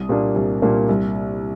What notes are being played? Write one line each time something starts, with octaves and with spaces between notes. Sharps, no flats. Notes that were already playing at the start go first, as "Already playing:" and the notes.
Already playing: C2 D#6
A#2 G3 A#3 D4
C2
A#2 G3 A#3 D4
C2